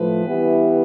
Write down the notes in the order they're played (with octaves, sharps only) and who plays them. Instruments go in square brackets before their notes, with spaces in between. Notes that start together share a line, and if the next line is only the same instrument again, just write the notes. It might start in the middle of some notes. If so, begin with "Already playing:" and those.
Already playing: [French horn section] A2 F3 [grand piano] B4
[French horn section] E3 G3 B3 E4 G4